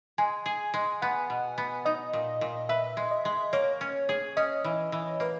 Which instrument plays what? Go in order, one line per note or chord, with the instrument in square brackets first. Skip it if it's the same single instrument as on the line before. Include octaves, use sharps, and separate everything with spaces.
[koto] G#3 [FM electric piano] G#5
[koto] G#4
G#3
[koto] B3 [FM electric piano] F#5
[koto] B2
B3
[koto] D#4 [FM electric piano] D#5
[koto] A#2
A#2
[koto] B4 [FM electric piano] E5
[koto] G#3
[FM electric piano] D#5
[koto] G#3
[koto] A#3 [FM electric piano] C#5
[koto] C#4
G#4
[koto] C#4 [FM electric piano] D#5
[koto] E3
E3
[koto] A#3 [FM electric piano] B4